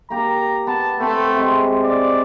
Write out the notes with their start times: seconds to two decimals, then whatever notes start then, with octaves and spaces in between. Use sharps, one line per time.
0.10 A#3 G4 A#5
0.67 B3 A5 A#5
1.00 A3 B3 C4 C5
1.36 C3 G#3
1.83 D5